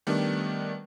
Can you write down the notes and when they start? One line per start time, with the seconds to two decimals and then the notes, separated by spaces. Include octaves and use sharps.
0.07 D#3 G3 A3 B3 D4